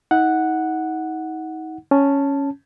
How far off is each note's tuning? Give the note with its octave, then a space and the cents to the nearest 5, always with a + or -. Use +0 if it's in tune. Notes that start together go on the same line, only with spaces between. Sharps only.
D#4 +35 F#5 +0
C#4 +0 A5 +0